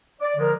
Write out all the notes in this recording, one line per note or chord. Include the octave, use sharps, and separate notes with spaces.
D5
D3 F3 G#3 A#4